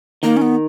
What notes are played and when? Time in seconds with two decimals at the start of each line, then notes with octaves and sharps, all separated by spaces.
0.23 D#3 A#3
0.37 C#4
0.42 B3